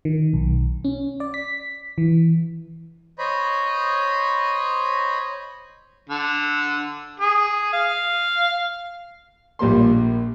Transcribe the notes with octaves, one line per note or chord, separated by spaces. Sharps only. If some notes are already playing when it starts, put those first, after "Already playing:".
D#3
B1
C#4
D5
B6
E3
C5 C#5 D#5 B5
D3
G#4
F5
A#1 G3 A#3 C6